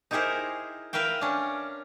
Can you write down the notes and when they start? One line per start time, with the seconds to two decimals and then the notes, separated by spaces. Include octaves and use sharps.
0.11 D#4 E4 G4 G#4 A#4 C5
0.93 A#4 B4 E5 F5 G5
1.21 C#4 D4